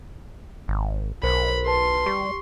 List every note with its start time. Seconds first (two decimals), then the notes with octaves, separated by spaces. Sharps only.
0.68 G#1
1.23 B1 A#4 C5 B5
1.67 B4 A5 C6
2.06 G3 G4 C#6